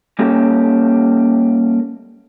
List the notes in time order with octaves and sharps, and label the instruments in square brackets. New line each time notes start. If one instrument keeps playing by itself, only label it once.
[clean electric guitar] G3 A#3 C#4 G4 A4